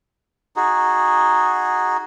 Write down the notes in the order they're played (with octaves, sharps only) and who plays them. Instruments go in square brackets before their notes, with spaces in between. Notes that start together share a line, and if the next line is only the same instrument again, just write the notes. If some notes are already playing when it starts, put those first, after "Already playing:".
[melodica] D#4 F#4 G#4